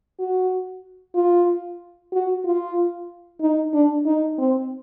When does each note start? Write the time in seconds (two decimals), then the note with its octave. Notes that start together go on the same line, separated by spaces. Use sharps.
0.19 F#4
1.15 F4
2.12 F#4
2.45 F4
3.41 D#4
3.74 D4
4.06 D#4
4.38 C4